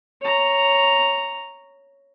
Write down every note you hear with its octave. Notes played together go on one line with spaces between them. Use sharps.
C#5 A#5